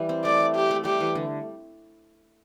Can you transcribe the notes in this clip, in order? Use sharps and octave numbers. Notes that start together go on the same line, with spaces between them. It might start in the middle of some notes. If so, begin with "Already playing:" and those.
Already playing: E3 G3
C4
A3 D5
G3
G4
A3
G3 G4
E3
D3